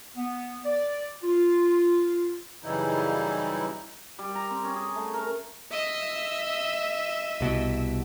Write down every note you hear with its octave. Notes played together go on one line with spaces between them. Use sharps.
B3
D5
F4
F#2 C#3 E3 G3 D#4 E4
G3
A#5
C4
C#4
G#4
A3
A#4
D#5 E5
C2 B2